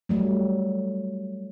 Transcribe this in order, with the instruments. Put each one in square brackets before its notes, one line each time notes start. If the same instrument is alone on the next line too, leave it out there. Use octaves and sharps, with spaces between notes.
[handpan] F#3 G3 A3